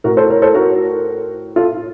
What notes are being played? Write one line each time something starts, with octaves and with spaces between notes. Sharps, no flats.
A2 F#4 A#4
A4 C5
A#4 C#5
A4 C5
F#4 A#4
F4 A4